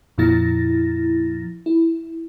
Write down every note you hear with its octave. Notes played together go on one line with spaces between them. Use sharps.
F2 A#2 F3 E4 A6 A#6
E4